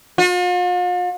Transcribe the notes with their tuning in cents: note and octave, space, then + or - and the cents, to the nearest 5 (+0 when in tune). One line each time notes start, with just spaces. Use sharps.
F4 +45